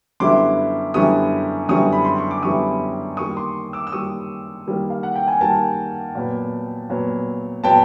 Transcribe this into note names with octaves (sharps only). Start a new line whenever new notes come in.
F#2 D3 G3 B3 E4 C6 D6
F#2 D3 G3 B3 E4 C#6 D#6
F#2 D3 G3 B3 E4 C#6 D#6
B5
C6
C#6
D6
F#2 D3 G3 B3 E4 C#6 D#6
D#3 G3 A#3 C#6 D#6
D#6
C6 D6
D6 E6
E6
D#3 G3 A#3 C#6 D#6
D#3 G3 A#3
F5
F#5
G5
G#5
D#3 G3 A#3 G5 A5
A#2 F#3 B3
A#2 F#3 B3
A#2 F#3 B3 G5 A5